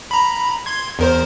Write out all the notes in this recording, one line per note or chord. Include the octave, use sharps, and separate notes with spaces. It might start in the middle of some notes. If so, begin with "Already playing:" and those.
A#5 B5
C6 G#6
E2 A#4 C5